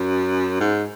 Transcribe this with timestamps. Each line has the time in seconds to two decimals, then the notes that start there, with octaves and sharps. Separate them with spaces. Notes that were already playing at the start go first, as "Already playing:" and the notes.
Already playing: F#2
0.60 G#2